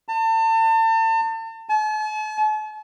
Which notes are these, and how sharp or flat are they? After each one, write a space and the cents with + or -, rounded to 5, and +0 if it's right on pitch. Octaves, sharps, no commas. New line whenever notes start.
A5 +35
A5 -45